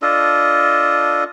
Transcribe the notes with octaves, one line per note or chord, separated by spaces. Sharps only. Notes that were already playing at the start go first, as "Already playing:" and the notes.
D4 F4 A4 D#5